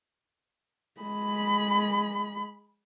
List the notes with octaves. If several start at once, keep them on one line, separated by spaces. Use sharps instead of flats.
G#3 B5